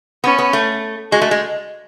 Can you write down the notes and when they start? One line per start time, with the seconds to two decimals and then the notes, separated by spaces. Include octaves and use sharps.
0.24 B3 C#4
0.38 B3
0.53 A3
1.12 G#3 F#4
1.22 A3
1.31 G#3